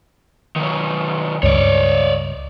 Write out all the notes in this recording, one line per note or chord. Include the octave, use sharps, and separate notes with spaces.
D#3 F#3
C#2 G2 C#5 D5